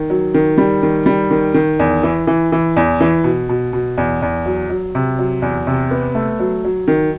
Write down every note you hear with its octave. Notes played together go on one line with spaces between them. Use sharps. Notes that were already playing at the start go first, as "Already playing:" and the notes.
Already playing: D#3
F#3
D#3
G3
D#3
G3
D#3
D#3
E2
E3
E3
E3
E2
E3
B2
B2
B2
E2
E2
F#3
F#3
C3
F#3
E2
C3
B3
A3
F#3
F#3
D#3